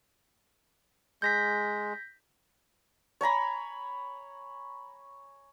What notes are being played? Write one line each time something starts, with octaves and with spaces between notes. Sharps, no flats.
G#3 G6 A#6 B6
C#5 G#5 A#5 B5